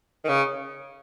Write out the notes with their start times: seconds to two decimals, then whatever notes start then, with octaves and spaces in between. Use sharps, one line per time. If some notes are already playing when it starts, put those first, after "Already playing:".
0.25 D#3
0.29 C#3